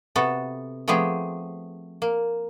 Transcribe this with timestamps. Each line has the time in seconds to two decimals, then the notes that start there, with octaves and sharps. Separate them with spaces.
0.16 C3 B3 F#4 A4
0.88 F3 A3 B3 C4 G4 G#4
2.02 A#3